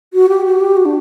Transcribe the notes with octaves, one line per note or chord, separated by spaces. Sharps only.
F#4
G4
F#4
G4
F#4
D4